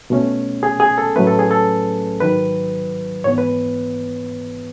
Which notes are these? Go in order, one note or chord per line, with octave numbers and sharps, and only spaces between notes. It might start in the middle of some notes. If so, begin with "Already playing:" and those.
B2 A3 C#4
G#4
G#4
A4
A2 F#3 A3 C#4 B4
A4
G#4
A4
G#2 D#3 F#3 B4
G#2 E3 B3 C#5
B4